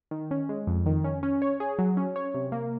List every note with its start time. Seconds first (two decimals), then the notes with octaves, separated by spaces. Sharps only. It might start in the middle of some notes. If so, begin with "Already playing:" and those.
0.11 D#3
0.31 C#4
0.49 G#3
0.67 F2
0.86 D#3
1.04 C#4
1.23 C#4
1.42 C#5
1.60 G#4
1.79 F#3
1.97 C#4
2.16 C#5
2.34 C3
2.52 A#3